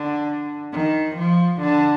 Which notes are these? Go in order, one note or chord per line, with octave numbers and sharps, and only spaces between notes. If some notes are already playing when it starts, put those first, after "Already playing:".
Already playing: D3
D#3
F3
D3